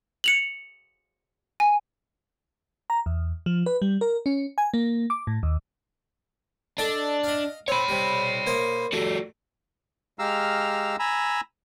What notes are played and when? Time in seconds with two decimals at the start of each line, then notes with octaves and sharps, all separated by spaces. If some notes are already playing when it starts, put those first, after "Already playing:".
0.24 C#7 F7 F#7
1.60 G#5
2.90 A#5
3.06 E2
3.46 F3
3.66 B4
3.82 G3
4.01 A#4
4.26 C#4
4.58 G#5
4.74 A#3
5.10 D6
5.27 A2
5.43 D#2
6.78 D4 A4 D#5 A5
7.24 D#5 F5
7.68 C4 C#5 B5
7.89 C3 G3
8.47 A#3 C5 D#5
8.93 G3 A3 F#4
10.19 G#3 G4 F5 A#5 E6 F6
10.99 G#5 A#5 B5 E6